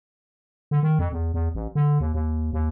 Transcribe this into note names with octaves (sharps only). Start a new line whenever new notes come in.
D3
D#3
F2
E2
E2
A1
D3
D#2
D#2
D#2